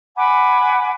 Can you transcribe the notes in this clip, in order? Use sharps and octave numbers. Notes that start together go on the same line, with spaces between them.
F#5 G#5 B5 D6